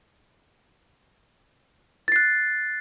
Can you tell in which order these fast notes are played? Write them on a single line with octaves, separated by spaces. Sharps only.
A6 C7 F#6